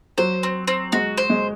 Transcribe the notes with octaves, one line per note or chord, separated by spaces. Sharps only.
F#3 C5
C4
C4
G#3 F#4
C5
G#3